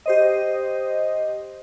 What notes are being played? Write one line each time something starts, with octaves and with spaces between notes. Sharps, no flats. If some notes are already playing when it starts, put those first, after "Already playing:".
G4 C5 D#5